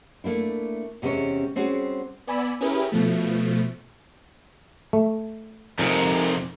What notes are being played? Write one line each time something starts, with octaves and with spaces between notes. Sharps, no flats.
A3 A#3 D4 E4
E2 C3 G#3 C4 C#4 C#5
G3 C4 C#4 F#4 G#4
B3 D5 G#5 B5 E6
C#4 E4 G4 G#4 A#4 B4
B2 F3 A3
A3
F2 C3 D#4 G#4 A#4